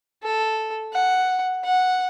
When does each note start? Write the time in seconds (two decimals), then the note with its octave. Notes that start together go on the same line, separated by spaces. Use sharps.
0.23 A4
0.93 F#5
1.64 F#5